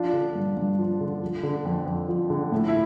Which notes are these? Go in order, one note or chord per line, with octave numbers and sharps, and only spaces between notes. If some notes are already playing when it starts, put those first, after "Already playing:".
Already playing: F3 D4 F4
D3
G2
G2
F3
D3
F3
D3
F2
F2
F3
D3
A2
E4